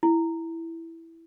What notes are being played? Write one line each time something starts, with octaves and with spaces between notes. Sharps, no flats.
E4